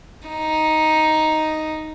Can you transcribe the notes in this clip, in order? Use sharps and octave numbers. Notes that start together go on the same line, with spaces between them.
D#4